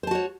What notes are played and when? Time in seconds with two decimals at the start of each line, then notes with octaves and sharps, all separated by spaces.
0.03 C5
0.07 A5
0.11 F#4
0.15 C#5